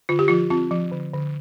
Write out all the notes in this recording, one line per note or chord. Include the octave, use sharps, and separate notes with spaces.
D3 F4
G4
F3 F4
C4 F4
F3
D3
D3